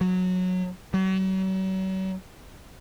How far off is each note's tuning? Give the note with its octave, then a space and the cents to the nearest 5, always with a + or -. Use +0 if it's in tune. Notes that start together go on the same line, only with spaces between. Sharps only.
F#3 -15
F#3 +40